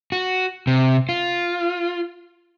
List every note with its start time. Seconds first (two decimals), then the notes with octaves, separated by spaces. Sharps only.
0.12 F#4
0.67 C3
1.09 F4